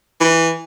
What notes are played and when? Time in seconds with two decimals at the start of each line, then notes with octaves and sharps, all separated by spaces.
0.21 E3